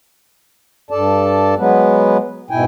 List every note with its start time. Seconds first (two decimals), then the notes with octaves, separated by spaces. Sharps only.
0.91 G2 A4 D5 A5
1.58 F#3 G#3 B3 B4
2.50 G#2 B2 E4 G5 G#5